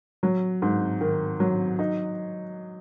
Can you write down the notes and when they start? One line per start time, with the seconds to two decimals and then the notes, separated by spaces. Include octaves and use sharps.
0.23 F#3
0.62 G#2
1.01 D#3
1.40 F#3
1.79 D#4